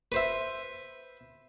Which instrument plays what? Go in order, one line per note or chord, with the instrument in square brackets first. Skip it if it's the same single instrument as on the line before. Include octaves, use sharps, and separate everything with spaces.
[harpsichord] B4 C5 E5